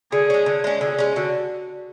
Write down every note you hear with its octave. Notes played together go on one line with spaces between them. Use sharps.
D3 G#4
G#3 C#4
D3
G#3 C#4
D3 G#4
G#3 C#4
D3 F#4